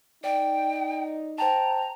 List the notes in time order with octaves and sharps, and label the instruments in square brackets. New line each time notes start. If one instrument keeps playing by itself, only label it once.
[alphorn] D#4 [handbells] D5 [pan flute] G5
[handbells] C5 G5 A5 [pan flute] A#5